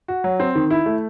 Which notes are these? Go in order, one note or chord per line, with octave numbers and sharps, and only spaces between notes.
F#4
F#3
C4
D#3
E4
A3